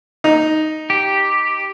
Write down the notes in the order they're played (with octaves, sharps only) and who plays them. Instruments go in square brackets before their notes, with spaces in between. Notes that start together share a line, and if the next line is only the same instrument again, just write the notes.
[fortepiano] D#4
[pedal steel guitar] G4